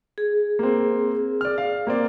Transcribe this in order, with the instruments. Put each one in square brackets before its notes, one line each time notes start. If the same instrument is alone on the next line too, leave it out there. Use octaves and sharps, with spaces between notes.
[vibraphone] G#4
[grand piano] A#3 C4
D5 F6
F5
A#3 C4 D5